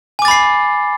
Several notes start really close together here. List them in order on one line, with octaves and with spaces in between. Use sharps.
G#5 D6 A6 B5 C7